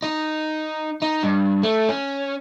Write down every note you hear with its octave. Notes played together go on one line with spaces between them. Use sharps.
D#4
D#4
G2
A3
C#4